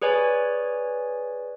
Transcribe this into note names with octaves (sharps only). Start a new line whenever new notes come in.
G#4 B4 C#5 D5 G#5